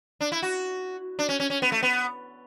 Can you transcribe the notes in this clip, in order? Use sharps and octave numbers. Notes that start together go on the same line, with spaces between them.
D4
E4
F#4
D4
C#4
C#4
C#4
B3
A3
B3